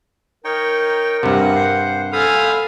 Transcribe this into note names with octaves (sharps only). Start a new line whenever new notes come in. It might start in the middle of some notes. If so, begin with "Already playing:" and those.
D#4 A#4 C#5 G5
G2 C3 F#5
C5
A4 C5 F5 G#5 B5 D#6